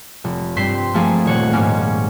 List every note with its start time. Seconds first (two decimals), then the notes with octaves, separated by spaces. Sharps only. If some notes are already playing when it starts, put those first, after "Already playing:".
0.24 F1
0.56 G2 C4 C6 B6 C7
0.94 F3 A3 A#3 G#4
1.25 D#1 C#5 F#5
1.53 G#2 A#3 C#4